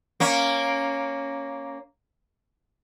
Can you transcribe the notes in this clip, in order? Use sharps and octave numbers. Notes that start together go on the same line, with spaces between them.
A#3 C#4